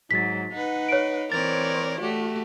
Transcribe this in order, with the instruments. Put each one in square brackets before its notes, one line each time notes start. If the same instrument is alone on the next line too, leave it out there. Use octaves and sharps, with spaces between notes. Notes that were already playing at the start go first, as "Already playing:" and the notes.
[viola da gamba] G#2 [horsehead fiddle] F#3 [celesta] A6 B6
[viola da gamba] D#4 B4 [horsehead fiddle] F#5
[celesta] C#5 D7
[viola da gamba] E3 A#4 D5 [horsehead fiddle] C4 C#5 [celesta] A6
[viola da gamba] A3 G4 [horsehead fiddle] F#4